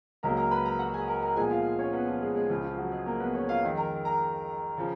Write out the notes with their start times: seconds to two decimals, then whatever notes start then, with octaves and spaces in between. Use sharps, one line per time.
0.23 C#2 C#3 F#3 A#3 A#4 A#5
0.37 A#4 A#5
0.51 B4 B5
0.65 A#4 A#5
0.79 F#4 F#5
0.94 G#4 G#5
1.08 A#4 A#5
1.22 A#4 A#5
1.36 A#2 F3 G#3 B3 G#4 G#5
1.50 F4 F5
1.79 C#4 C#5
1.93 B3 B4
2.07 F3 F4
2.21 G#3 G#4
2.35 G#3 G#4
2.49 C#2 C#3 F3 F4
2.64 F3 F4
2.73 G#4
2.78 F#3 F#4
2.92 G#3 G#4
3.06 A#3 A#4
3.20 B3 B4
3.34 C#4 C#5
3.49 F4 F5
3.63 F2 D#3 G#3
3.77 A#4 A#5
4.05 A#4 A#5
4.78 C#3 F3